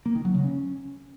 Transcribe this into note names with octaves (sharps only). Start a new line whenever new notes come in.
A#3
D#3
F#3
C#3
C#4